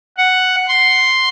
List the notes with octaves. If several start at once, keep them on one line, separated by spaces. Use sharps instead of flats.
F#5
C6